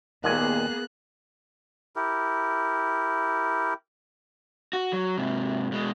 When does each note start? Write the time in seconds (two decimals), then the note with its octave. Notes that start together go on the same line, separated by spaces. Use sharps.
0.24 D#2 A#2 A#3 B3 G#4 G#5 F#6
1.96 E4 G4 A#4
4.73 F#4
4.93 F#3
5.18 G#2 C3
5.72 B2 G#3